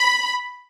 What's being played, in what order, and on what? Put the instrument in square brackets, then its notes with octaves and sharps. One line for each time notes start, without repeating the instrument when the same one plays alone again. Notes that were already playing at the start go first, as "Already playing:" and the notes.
Already playing: [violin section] B5